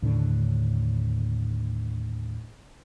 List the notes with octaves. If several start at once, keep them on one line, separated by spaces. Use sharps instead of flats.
D#2 A2 D3 D4